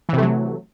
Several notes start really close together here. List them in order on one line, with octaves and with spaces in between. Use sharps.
E3 C3 A3 F#3